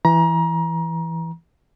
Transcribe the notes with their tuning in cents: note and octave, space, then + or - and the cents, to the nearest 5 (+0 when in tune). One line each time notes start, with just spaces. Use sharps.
E3 +5 A#5 +30